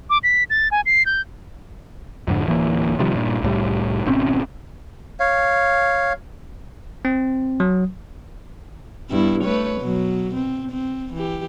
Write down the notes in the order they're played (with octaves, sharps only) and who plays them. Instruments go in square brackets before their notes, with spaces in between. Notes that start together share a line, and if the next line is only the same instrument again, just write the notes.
[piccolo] D6
B6
A6
G#5
C7
G6
[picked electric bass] F2 G#2 D3
D1 E3 A#3
C3 D#3 F3 G3
G2 A#2
C2 A2 G3
G#1 B2 C4 C#4
[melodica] C#5 F5
[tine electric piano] C4
F#3
[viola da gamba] G2 B3 E4
A3 B4 C#5
B2 F#3
C4
C4
E3 G4